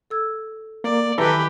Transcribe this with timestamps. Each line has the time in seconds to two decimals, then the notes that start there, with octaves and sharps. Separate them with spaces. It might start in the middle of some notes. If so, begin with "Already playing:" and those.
0.10 A4 E6 G#6
0.84 A#3 D5
1.18 D#3 E3 F#3 G4 A4 B4 E5 A#5